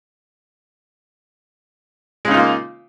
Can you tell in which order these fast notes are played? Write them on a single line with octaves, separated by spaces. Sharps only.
G#3 C#3 D#4 F4 A#3